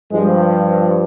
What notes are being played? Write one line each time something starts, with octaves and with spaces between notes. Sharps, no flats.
G2 F3 G#3